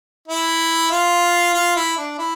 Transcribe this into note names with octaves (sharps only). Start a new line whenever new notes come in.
E4
F4
F4
E4
D4
E4